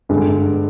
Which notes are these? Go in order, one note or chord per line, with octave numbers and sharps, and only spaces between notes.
G2 D3 G#3